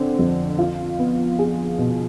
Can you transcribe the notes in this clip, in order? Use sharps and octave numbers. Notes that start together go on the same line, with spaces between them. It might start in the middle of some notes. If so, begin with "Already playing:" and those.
Already playing: D3 C4
F2
F4
B3
G#4
B2